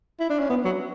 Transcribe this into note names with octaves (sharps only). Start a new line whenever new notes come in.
E4
D4
C#4
B3
F#3